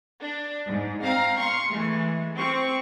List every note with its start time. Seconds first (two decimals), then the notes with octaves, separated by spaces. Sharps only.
0.21 D4
0.67 G#2
1.03 C4 F5 A#5
1.38 F5 C6 C#6 C#7
1.69 E3 G#3 A3
2.37 C4 C#6